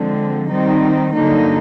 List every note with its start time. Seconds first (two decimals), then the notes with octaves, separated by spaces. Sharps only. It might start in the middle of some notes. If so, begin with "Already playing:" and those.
Already playing: D3 F3 G#3 C4
0.50 D#3 G3 C4 D#4
1.15 G2 D3 F#3 A#3 D#4